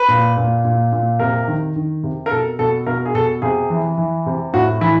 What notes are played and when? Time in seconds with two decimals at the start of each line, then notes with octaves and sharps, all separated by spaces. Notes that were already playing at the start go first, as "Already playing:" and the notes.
Already playing: B4
0.08 A#2
0.37 A#2
0.65 A#2
0.93 A#2
1.19 C3 A#4
1.48 D#3
1.76 D#3
2.03 C3
2.26 A#4
2.31 B2 A4
2.59 B2 A4
2.86 B2 A#4
3.06 G#4
3.15 B2 A4
3.42 C3 G#4
3.70 E3
3.98 E3
4.26 C3
4.54 A2 F#4
4.81 E3 E4